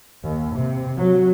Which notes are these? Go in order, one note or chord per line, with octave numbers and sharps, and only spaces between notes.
D#2
C3
F#3